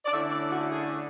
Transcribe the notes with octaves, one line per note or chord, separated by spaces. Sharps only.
D5
D3 A3 C#4 E4 E5
D5
F#4
G#4